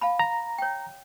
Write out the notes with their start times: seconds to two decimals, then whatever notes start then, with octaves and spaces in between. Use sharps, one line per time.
0.01 F5 A5 B5
0.19 A#5
0.58 C#5 G5